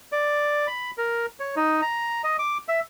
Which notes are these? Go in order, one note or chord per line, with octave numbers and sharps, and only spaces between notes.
D5
B5
A#4
C#5
D#4
A#5
D#5
D6
E5